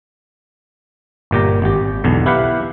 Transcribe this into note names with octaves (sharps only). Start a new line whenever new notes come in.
G1 A#2 G4 A#5
G#1 G4
B1 E2 D3
E4 G4 B4 F5 F#5